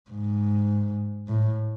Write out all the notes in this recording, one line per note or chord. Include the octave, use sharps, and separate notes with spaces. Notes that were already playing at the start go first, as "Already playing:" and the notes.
G#2
A2